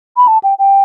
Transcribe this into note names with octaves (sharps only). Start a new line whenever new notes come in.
B5
A5
G5
G5